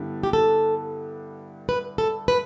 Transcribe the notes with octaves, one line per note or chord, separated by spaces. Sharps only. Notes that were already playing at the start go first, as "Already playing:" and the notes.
Already playing: G2 D3 G3 B3 E4
G4
A4
B4
A4
B4